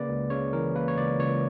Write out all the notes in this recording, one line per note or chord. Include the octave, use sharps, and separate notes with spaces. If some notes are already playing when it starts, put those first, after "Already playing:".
Already playing: C#3 A#3 B4 D5
C#2
C#3 C#5
E3 A#4
A#3 B4
C#5
C#2 D5
C#2 C#5